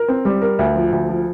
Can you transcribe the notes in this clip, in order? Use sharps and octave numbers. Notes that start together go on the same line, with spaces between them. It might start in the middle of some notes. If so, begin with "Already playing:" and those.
Already playing: A#4
C4
G3
A#4
D2
F3
D2
F3